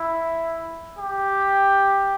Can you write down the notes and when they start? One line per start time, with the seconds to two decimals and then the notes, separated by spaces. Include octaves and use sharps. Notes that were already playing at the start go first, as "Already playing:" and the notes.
Already playing: E4
0.99 G4